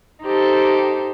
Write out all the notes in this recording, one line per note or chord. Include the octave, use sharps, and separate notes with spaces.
D#4 G4 A4 C5